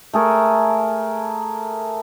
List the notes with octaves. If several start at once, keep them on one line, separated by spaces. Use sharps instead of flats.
A3 G#4 A#4